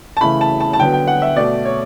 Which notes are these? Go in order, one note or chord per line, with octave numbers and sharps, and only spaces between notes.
A5
C#3 E3 A3 B5
A5
A5
A5
D3 F#3 B3 G5
G5
F#5
E5
B2 A3 D5
C#5